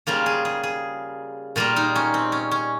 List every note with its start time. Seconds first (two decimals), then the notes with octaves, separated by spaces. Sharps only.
0.07 C#3 G3 A#3 F4
0.26 G#4
0.45 G#4
0.63 G#4
1.56 A#2 G3 A#3 F4
1.76 D#4
1.96 C#4
2.14 C4
2.32 C#4
2.51 C#4